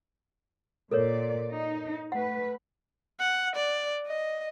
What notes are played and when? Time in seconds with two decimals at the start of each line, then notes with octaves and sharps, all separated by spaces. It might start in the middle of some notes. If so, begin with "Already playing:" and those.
0.91 A#2 A4 A#4 C#5 D5
1.51 D#4
2.12 A3 B4 F#5
3.20 F#5
3.55 D5
4.07 D#5